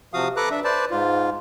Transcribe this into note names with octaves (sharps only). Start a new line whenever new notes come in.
C3 F3 F#4 F5 D#6
A4 B4 A#5 D6 F#6
D4 E5
B4 C5 D5 A5
G#2 F4